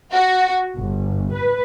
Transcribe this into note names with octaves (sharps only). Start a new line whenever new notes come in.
F#4
G1
B4